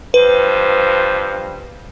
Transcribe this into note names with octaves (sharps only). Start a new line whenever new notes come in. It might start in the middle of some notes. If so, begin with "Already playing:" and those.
G2 F3 B4 C5